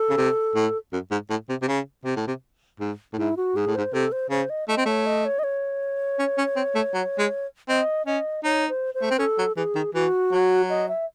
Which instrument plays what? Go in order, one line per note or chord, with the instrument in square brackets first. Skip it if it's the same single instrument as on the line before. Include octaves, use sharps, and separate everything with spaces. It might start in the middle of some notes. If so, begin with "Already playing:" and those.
Already playing: [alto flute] A4
[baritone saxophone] C#3
C3
A2
F#2
G#2
A2
C3
C3
C#3
C3
A2
C3
G#2
A2
[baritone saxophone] G#2 [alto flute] E4
[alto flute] F#4
[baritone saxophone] G#2 [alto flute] G#4
[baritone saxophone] A2
[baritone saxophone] G#2 [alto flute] C5
[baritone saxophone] C3 [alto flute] A4
[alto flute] C5
[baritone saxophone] C#3 [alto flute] C5
[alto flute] D#5
[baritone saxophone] A3 [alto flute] D#5
[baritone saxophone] C4
[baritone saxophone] A3 [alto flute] C#5
[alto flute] D#5
C#5
D#5
C#5
[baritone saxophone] C#4
C#4
C4
A3
F#3
G#3
[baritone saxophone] C4 [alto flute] D#5
[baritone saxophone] C#4 [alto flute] D#5
[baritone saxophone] D#4 [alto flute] C#5
[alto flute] C5
C5
[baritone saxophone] A3
C4
[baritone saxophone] C#4 [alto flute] A4
[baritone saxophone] F#3
[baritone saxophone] E3 [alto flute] G#4
[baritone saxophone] D#3
[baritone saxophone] E3 [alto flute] F#4
[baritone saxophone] F#3
[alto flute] D#5
E5